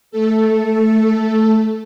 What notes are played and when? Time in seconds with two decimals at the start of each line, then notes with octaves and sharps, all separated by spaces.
0.11 A3 A4